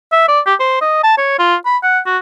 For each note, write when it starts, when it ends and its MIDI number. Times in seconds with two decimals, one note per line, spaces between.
0.12 0.23 76
0.28 0.40 74
0.46 0.54 67
0.60 0.80 72
0.81 1.00 75
1.03 1.16 81
1.18 1.34 73
1.39 1.55 65
1.65 1.77 83
1.83 1.99 78
2.06 2.17 66